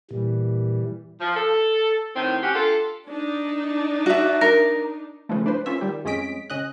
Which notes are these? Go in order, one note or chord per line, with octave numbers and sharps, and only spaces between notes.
A#2 E3 G3
F3
A4
A2 D#3 C4
C#4 F#4 G4
D4 F4 A4
D4 D#4
F#4 E5
A#4
C#3 E3 F3 G#3 A3
D4 B4 C5
A#3 C#4 F4 E5
D#3 G3 G4
F2 G#3 C#4 D#5 B6 D7
C#3 D#5 F#6